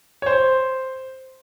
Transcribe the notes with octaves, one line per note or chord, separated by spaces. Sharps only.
C#5
C5